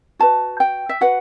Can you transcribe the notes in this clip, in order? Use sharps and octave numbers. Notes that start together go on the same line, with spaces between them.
F#4 B4 A5
G5
E5
F#4 B4 F#5